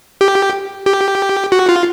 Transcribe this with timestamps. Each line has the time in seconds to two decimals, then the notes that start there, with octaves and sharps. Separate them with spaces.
0.21 G4
0.86 G4
1.52 F#4
1.69 F4